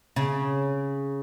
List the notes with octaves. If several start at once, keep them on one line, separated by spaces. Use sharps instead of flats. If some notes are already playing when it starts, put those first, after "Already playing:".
C#3